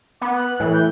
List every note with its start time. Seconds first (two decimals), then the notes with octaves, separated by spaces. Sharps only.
0.22 B3 D6
0.35 F#6
0.60 A2 E3
0.73 G6